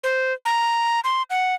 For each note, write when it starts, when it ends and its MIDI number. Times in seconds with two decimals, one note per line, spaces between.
0.04 0.33 72
0.45 1.00 82
1.04 1.23 84
1.30 1.55 78